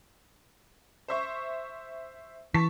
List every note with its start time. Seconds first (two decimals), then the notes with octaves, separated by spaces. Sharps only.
1.08 C5 E5 C#6
2.54 E3 A5 C#6 B6